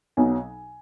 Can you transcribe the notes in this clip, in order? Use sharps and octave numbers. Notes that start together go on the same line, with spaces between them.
B1 B2 F#3 G#5